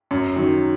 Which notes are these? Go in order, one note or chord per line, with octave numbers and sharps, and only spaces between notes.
F#2
D#3 F#3